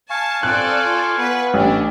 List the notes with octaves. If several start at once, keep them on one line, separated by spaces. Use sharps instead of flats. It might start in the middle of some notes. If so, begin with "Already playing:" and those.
F5 G#5 A5 C#6
C4 A4 D5 F#6
F4
B3 B4
A1 C#4 D4